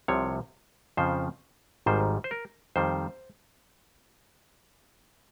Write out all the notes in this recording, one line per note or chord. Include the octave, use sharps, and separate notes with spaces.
C2 C3 F3 C#5
F2 C#3 F3 C5
G#1 G#2 D#3 G3 C5
C5
A#4
F2 D#3 G3 C5